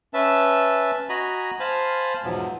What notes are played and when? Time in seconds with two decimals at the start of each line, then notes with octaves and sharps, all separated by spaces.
0.14 C#4 B4 E5 A5
1.09 F#4 D#5 G#5 A#5 B5
1.60 C5 F5 G#5 A5 B5
2.24 E2 G#2 B2 F3 F#3